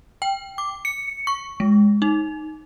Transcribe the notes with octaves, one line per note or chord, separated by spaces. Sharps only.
G5
D6
C#7
C#6
G#3
D#4